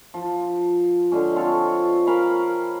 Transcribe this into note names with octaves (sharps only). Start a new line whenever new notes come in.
F3
D3 G#3 C#4
C4 F4 A4 C#5
C#4 A#4 F5 B5